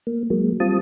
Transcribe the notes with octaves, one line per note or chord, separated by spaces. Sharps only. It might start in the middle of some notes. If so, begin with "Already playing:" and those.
A#3
F#3 G#3 A#3
G3 C4 F4 A5 D#6